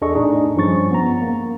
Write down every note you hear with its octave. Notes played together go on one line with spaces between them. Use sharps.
E2 D4 G#4 A4 D#5 C#6
A2 D4 D#4 G#4
G2 F3 C#4 C#6 A6
B3 A#5
A#3